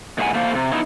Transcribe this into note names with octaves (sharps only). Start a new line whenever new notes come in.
A#2 G#3 E4 C5 F#5 G#5
A3 A#3 C5 F5
C3
B3 D#4 E4